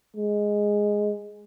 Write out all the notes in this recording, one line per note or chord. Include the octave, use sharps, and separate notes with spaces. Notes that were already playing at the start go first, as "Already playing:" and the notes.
G#3